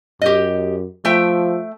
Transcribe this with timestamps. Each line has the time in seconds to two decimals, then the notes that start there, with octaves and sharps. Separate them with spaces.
0.22 F#2 G4 D#5
1.05 F3 A3 E5 G5